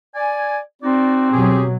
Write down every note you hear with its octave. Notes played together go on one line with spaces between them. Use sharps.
D5 G#5
C4 D#4 F#4 D5
B2 F#3 G4 G#4